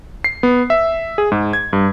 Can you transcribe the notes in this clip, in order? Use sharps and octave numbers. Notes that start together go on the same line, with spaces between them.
C7
B3
E5
G#4
G#2
G#6
G2